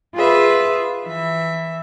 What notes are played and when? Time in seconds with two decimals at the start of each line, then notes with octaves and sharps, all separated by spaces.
0.14 F4 G#4 B4 E5
1.06 E3 E5